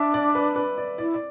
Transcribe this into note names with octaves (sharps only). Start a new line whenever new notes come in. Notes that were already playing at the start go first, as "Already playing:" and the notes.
Already playing: D4 E5
D5
B4
B4
D5
E4 D5
D5